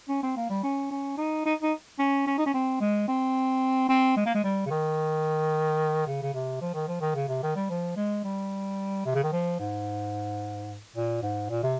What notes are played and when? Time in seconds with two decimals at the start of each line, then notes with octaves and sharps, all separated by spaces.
0.09 C#4
0.23 C4
0.37 A#3
0.50 G3
0.63 C#4
0.91 C#4
1.18 D#4
1.46 D#4
1.62 D#4
1.99 C#4
2.27 C#4
2.38 D#4
2.46 C#4
2.54 C4
2.81 G#3
3.08 C4
3.89 C4
4.17 G#3
4.26 A#3
4.35 G#3
4.44 G3
4.66 C#3
4.71 D#3
6.07 C#3
6.23 C#3
6.34 C3
6.61 F3
6.74 D#3
6.88 F3
7.01 D#3
7.15 C#3
7.29 C3
7.43 D#3
7.56 G3
7.70 F3
7.97 G#3
8.24 G3
9.06 C3
9.15 C#3
9.24 D#3
9.33 F3
9.60 G#2
10.96 A#2
11.23 G#2
11.50 A#2
11.63 C3